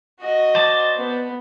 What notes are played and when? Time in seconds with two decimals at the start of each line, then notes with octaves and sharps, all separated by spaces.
0.20 F#4 D#5
0.55 C5 D5 A5
0.96 B3